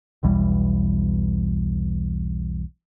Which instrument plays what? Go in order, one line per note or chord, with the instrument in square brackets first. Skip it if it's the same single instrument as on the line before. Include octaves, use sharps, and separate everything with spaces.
[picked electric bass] E1 B1 E2 G3